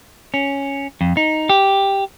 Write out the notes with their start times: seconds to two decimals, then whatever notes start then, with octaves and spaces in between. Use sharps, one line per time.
0.34 C#4
1.01 F2
1.17 D#4
1.50 G4